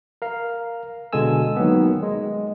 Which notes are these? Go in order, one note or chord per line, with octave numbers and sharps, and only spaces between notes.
A#4 F5
B2 D3 G#3 A4 G#5 E6
D#3 F#3 A#3 B3
G#3